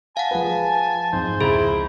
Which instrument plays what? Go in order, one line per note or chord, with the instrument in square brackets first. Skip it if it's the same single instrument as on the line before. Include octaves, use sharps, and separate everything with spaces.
[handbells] F5 F#5 [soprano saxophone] G#5 [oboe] A5
[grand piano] F3 G#4 B4
[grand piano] F2 G#2 [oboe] C5
[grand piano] C#2 A#5 [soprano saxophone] E4 [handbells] G#4